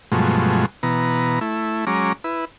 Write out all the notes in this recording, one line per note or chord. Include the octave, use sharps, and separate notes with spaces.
G2 B2 F3 F#3 G#3 A3
B2 E3 B3 A#5
A3 E4
F#3 G#3 C#4 A#5 D6
E4 B4